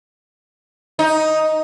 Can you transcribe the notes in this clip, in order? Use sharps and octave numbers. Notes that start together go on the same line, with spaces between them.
D#4